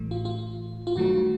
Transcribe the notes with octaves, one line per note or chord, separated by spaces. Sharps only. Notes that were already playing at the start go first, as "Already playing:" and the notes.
Already playing: A1 A2 E3 A3
F4
F4
F4
G2 D#3 F#3 A3 F#4